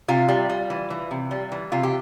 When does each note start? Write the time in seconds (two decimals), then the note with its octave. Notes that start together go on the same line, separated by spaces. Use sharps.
0.08 C3 F4
0.28 G3
0.49 G3
0.70 E3
0.90 E3
1.11 C3
1.31 G3
1.52 E3
1.72 C3 F4
1.83 G4